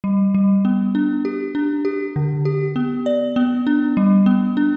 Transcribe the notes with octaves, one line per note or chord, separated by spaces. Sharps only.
G3
G3
B3
D4
G4
D4
G4
D3
G4
B3
D5
B3
D4
G3
B3
D4